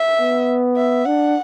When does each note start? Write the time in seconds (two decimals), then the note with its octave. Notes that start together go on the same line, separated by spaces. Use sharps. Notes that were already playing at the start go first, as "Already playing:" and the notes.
Already playing: E5
0.20 B3
0.77 E5
1.05 D4 F#5